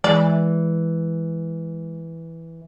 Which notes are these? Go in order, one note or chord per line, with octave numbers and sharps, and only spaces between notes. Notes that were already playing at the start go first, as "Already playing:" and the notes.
E3 G#3 D5